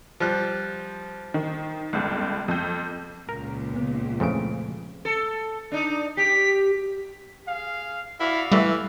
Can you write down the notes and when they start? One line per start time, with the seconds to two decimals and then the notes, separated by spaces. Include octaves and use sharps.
0.20 F3 G3 F#6
1.34 D#3
1.93 G1 C#2
2.48 F2 G6
3.29 C#2 A#2 A#4
3.74 C#3 B3
4.20 F2 C#3 E3 F3 A3 D7
5.05 A4
5.72 D4 D#4
6.17 G4 B6
7.47 G#4 F5
8.20 E4 F#4 D5 F5
8.52 E3 G3 A3